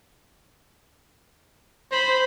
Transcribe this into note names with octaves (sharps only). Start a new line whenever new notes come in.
C5 B5